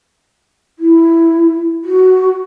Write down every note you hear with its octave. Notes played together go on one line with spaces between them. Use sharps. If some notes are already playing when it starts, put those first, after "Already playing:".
E4
F#4